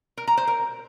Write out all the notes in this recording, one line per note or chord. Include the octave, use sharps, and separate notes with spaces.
A#4
A#5
C5
A#4